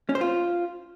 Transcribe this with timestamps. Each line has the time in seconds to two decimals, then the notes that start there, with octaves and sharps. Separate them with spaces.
0.09 C#4
0.15 C5
0.21 F4